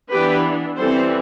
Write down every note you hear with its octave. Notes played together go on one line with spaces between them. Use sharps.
E3 B3 D4 G4 B4
E3 G3 C4 A4 C5